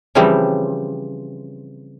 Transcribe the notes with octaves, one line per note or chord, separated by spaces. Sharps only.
C#3 E3 F3 G3 C4